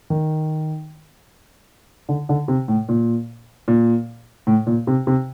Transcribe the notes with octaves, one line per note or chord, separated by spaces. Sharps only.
D#3
D3
D3
C3
A2
A#2
A#2
A2
A#2
C3
C3